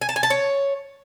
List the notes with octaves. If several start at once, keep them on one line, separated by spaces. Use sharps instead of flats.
G#5
A5
G#5
A5
C#5